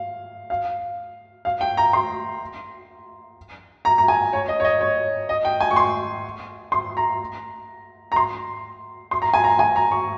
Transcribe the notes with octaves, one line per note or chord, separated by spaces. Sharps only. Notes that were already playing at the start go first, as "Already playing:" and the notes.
Already playing: F5
F5
F5
G5
A#5
C6
A#5
A#5
G#5
C#5
D#5
C#5
D#5
C#5
D#5
G5
G#5
C#6
C6
C6
A#5
A#5
C6
C6
A#5
G#5
A#5
G#5
A#5
C#6